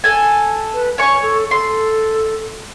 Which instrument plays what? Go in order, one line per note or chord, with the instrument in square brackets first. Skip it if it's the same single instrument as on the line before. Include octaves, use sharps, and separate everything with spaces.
[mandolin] A4 G#5
[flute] B4
[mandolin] C#5 C#6 [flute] G#5
[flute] A4
[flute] A4 [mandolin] C6